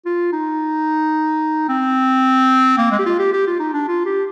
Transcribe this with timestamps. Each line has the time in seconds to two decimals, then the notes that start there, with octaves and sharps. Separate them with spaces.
0.05 F4
0.32 D#4
1.68 C4
2.78 A#3
2.92 G#3
2.99 G4
3.06 F4
3.19 G4
3.33 G4
3.47 F4
3.59 D#4
3.73 D4
3.88 F4
4.06 G4